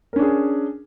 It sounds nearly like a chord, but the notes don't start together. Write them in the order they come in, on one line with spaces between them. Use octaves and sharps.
A#4 C#4 D4 G#4